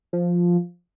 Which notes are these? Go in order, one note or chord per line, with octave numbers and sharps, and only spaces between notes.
F3